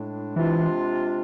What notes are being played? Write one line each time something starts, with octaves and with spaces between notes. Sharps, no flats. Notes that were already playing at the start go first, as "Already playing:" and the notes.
Already playing: A2 G#3 D4
C3 E3 G#3 D4 F4